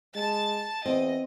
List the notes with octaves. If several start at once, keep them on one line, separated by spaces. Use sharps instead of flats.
G#3 A5 A6
E2 C4 D#5